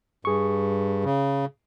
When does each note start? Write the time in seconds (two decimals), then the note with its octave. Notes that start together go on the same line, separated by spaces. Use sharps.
0.25 G2 G#4 C#6
1.04 C#3